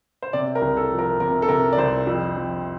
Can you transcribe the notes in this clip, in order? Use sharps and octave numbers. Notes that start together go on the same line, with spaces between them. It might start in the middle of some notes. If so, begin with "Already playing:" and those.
C5
C3 D5
A#4
C2
A4
F3
A#4
C3 A#4
A4
C3 A#4
D5
C2 C5
F2
F2